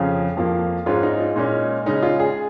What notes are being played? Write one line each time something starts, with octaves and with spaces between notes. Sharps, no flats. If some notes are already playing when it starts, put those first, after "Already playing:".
Already playing: F2 C#3 F3 C#4 F5
F2 F3 A#3 F5
G#2 G#3 C#4 F4
D#4
F4
A#2 G#3 C#4 D#4
C#3 G#3 C#4 D#4
F4
G#4